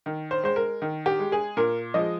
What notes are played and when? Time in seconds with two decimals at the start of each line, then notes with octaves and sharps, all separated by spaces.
0.06 D#3
0.31 C5
0.44 G#3 C5
0.56 A#4
0.82 D#3
1.06 G4
1.19 G#3
1.32 G#4
1.57 A#2 A#4
1.94 F3 G#3 D#5